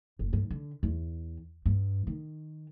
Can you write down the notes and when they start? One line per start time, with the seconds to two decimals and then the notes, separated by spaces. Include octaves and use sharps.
0.19 F#1
0.33 G2
0.51 D3
0.83 E2
1.66 G2
2.07 D#3